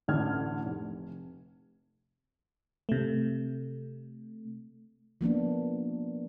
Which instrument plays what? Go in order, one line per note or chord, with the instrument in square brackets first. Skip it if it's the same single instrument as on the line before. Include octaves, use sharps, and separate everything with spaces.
[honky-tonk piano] A1 D2 D3 F6 G#6
F1
[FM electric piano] C3 A3
[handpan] F3 A#3 B3 D4